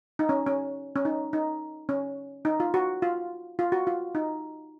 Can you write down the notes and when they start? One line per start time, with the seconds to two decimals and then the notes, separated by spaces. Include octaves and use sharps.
0.19 D#4
0.29 C#4
0.47 C#4
0.96 C#4
1.05 D#4
1.33 D#4
1.89 C#4
2.45 D#4
2.60 F4
2.74 F#4
3.02 F4
3.59 F4
3.72 F#4
3.87 F4
4.15 D#4